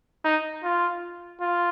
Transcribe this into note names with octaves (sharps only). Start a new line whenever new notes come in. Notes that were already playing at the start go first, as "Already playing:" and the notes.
D#4
F4
F4